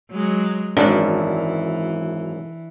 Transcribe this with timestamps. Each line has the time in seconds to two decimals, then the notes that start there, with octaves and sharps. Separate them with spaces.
0.11 F#3 G#3
0.77 G#1 F#2 E3 D4